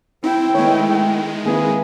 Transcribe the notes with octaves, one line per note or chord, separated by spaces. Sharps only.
C4 E4 G5
D#3 G#3 A3 B3 C#5
A#3 C4 E4 G#4 B4